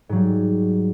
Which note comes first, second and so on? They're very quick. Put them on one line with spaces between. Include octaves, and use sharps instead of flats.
G#2 F#3 G3